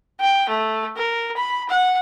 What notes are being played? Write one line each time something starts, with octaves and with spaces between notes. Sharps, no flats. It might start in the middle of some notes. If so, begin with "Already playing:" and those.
G5
A3
A#4
B5
F#5